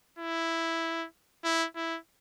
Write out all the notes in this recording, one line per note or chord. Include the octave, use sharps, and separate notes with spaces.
E4
E4
E4